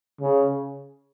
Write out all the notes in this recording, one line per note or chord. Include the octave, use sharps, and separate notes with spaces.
C#3